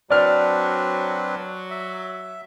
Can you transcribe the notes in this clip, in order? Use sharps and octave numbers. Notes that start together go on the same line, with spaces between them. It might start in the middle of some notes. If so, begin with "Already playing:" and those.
F#3 C4 D4 B4 D5 F6
E5